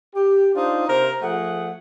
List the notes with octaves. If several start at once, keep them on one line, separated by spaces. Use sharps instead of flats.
G4
D4 D#4 F4 C5
C3 A#4 C5 A#5
F3 A3 G#4 F#5